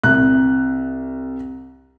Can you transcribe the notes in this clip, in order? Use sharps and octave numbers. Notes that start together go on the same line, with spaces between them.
C2 F#6